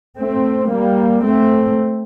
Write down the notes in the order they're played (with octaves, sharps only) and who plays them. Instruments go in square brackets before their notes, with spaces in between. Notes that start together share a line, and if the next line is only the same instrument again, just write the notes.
[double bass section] A3 C4
G3 A#3
A3 C4